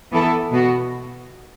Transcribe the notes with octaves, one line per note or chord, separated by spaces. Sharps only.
E3 B3 E4 A4
B2 B3 F#4